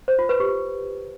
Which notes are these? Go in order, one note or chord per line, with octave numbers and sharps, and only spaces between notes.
C5
F4
B4
G4